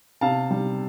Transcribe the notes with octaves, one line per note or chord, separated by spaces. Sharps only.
C3 F5 A5
G3